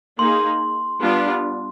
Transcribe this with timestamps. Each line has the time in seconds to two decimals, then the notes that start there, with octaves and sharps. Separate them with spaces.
0.18 A#3 D#4 G#4 C6
1.01 G3 B3 D4 F4